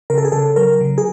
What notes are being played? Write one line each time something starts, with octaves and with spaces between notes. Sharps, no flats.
C#3 A#4
A4
G#4
C#3 A4
F#3 A#4
C#3
G#4